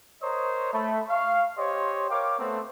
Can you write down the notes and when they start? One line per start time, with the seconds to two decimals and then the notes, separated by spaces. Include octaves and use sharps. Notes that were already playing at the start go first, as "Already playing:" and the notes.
0.22 A#4 C5 C#5 D#5 A#5 D#6
0.73 A3 B5
1.09 F5 C#6
1.57 G4 C5 C#5 D#5 C6
2.10 A#4 C#5 F5 G5 D6
2.39 A3 B3 C4